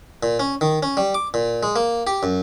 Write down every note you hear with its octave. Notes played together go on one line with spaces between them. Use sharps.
A#2
C#4
D#3
C#4
G3
D6
A#2
G#3
A#3
G4
F#2